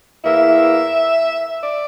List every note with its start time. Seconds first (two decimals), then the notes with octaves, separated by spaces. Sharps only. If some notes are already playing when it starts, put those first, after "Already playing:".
0.24 E2 E3 A#3 E4 E5
1.63 D5